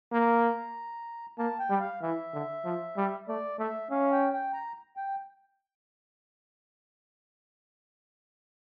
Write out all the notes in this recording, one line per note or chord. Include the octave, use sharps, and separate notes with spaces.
A#3 A#5
A#3 A5
G5
G3
F5
E3 E5
D3
F3
G3
A3 D5
A3 E5
C#4 F5
G5
G5
A#5
G5